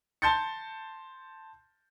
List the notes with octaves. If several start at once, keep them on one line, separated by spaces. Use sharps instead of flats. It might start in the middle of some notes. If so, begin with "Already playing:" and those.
A5 C6 G6 A6 C#7